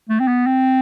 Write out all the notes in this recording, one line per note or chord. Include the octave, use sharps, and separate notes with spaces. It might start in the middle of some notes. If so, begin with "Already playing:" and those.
A3
C4
B3
C4